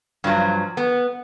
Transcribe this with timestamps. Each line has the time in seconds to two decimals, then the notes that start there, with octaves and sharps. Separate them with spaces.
0.24 G2 F3 F#3
0.77 B3